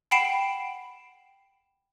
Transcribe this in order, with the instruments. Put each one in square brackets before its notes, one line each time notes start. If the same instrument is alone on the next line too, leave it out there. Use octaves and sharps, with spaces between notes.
[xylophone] F#5 G5 B5 C7 D7 E7